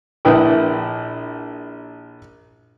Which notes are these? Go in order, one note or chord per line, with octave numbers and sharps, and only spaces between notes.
A#1 E4 B4 G5 D#6